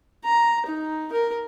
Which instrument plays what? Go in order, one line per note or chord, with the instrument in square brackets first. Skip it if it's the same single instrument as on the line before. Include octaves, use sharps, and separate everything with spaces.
[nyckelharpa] A#5
D#4
A#4